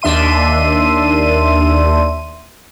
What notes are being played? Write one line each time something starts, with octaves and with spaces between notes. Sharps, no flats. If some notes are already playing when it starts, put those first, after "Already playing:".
D#2 D4 E5 C6 D#7